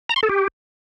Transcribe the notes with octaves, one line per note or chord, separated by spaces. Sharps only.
A#5
C6
A4
G4